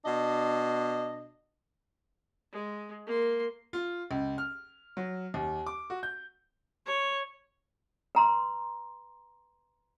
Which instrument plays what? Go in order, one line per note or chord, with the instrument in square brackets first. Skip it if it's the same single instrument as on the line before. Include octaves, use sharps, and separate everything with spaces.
[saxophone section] B2 D4 D#5
[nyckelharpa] G#3
A#3 C6
[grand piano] F4
C#2
F6
F#3
D#2
D6
F#4
G6
[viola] C#5
[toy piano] B4 A#5 C6